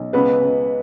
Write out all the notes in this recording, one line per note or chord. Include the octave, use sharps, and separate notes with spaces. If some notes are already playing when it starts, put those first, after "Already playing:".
Already playing: B1
C#2 B3 B4
C#2